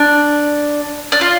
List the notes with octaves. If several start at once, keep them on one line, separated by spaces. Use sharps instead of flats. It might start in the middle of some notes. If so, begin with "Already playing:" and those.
Already playing: D4
D4
F4